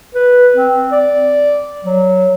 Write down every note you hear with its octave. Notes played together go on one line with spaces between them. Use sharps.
B4
C4
D5
F#3